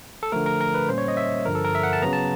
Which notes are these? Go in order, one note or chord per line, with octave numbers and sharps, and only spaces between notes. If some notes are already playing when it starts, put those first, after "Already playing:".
A4
D3 F3 A3 A#4
A#4
A#4
B4
A#2 G3 A#3 C#4 C5
C#5
D#5
E5
G2 D3 F3 A#4
A4
A#4
E5
F#5
A5
C#3 F#3 B3 A#5
A5